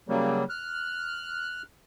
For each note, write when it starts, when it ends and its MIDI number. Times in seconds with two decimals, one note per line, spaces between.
0.09 0.44 49
0.09 0.44 54
0.09 0.44 55
0.09 0.44 58
0.49 1.63 89
0.49 1.63 90